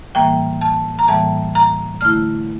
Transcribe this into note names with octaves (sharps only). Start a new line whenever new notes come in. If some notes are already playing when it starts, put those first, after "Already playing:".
A2 E3 G3 A#3 G5
A5
A#5
A2 E3 G3 A#3 A5
A#5
D3 A3 E4 F6